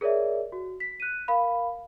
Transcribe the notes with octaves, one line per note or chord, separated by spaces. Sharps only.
G#4 A#4 C#5 D5 E5
F#4
B6
F#6 D#7
A#4 F5 B5